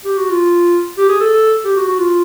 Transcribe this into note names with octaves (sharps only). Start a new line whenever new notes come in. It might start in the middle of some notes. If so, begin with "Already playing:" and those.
G4
F#4
F4
G4
G#4
A4
G4
F#4
F#4
F4